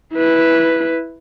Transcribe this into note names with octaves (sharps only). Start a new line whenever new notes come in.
E4 B4